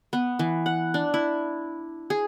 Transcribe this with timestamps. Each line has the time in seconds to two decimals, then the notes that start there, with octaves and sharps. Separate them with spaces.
0.13 B3
0.39 E3
0.66 F#5
0.94 D4
1.14 E4
2.10 G#4